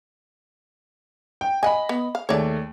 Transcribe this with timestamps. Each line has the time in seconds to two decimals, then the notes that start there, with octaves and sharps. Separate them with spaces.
1.41 G5
1.63 D#5 F#5 G#5 B5
1.89 B3
2.15 F5
2.29 D#2 A3 G#4 C#5 D5